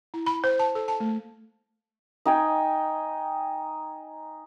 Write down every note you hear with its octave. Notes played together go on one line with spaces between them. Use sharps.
E4
B5
C5
A5
A4
A5
A3
D#4 G5 G#5